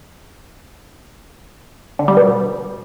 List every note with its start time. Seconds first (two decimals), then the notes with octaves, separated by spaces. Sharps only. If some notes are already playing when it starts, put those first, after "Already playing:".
1.99 D3
2.08 G3
2.17 B2